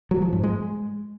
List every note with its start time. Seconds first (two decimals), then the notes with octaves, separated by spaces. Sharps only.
0.11 F#3
0.22 F3
0.33 G#2
0.43 G#3